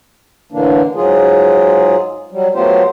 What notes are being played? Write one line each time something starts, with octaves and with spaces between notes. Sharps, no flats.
A2 D3 E3 A#3 D4
G#2 F#3 F4 G#4
F#3 G3
F#3 A3 B3 F4 G4 C5